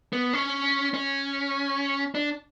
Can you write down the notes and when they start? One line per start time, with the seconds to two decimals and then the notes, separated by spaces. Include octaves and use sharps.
0.13 B3
0.33 C#4
0.94 C#4
2.15 D4